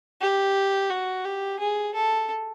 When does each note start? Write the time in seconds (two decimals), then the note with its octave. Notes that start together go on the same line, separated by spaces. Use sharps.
0.21 G4
0.90 F#4
1.25 G4
1.60 G#4
1.94 A4